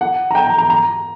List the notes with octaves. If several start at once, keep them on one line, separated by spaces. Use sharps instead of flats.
F#5
A#5
G5
A#5
A#5
A#5